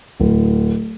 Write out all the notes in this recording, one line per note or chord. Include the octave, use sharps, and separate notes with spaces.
D1